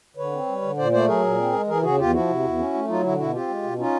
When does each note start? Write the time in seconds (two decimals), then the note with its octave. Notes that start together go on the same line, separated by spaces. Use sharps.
0.17 D3 B4 C#5
0.32 C4
0.47 G3
0.62 D3
0.77 A#2 C5 D5
0.92 A3 C5 D5
1.07 F#3 G#4 A#4
1.22 A#2
1.38 C4
1.52 G#3
1.67 E3 G#4 A#4
1.82 C#3 F#4 G#4
1.97 E2 F4 G4
2.12 F3 E4 F#4
2.27 C3
2.43 E2
2.58 C#4
2.73 A3
2.88 F#3 D#4 F4
3.03 D3 E4 F#4
3.18 B2 E4 F#4
3.33 C4 F4 G4
3.48 G#3
3.63 B2
3.78 C#4 D#4 F4